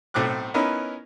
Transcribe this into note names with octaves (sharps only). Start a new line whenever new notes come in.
B1 A2 A3 C4 D6 F#6
B3 C#4 D#4 E4 A#4 B4